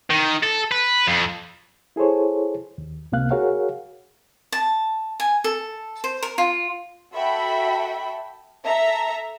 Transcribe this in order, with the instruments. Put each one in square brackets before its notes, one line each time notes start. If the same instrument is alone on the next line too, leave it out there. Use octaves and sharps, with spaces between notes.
[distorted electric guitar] D#3
A4
B4
F2
[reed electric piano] E4 G#4 A4 C5 C#5
D#2
C#2 C3 A#3 F5 F#6
F#4 G#4 A#4 C#5 F5 F#5
[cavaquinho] A5
G#5
A4
C5
A#4
F4
[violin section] F#4 A4 E5 G5 B5
A4 E5 A#5